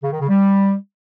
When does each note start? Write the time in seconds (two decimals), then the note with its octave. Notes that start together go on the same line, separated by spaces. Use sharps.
0.03 C#3
0.12 D#3
0.20 C#3
0.29 G3